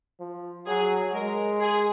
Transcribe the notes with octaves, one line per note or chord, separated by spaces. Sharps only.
F3
F#3 G#4
G#3 A#4
G#4